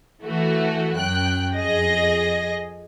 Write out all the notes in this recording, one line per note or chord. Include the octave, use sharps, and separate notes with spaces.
E3 A3 F#4
F#2 G5 F#6
F2 G#4 D#5 A#6